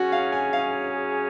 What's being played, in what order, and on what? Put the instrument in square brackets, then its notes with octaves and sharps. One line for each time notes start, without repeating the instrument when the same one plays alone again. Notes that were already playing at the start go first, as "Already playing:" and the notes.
Already playing: [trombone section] F#3 C#4 G#4 [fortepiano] F#4
[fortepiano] F5
G#5
F5